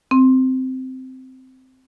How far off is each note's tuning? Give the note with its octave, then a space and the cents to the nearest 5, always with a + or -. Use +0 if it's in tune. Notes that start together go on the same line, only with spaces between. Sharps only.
C4 -10